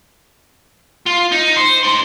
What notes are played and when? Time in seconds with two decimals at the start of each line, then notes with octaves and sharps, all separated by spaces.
1.06 F4
1.32 D#4
1.56 C5
1.83 D#4 C6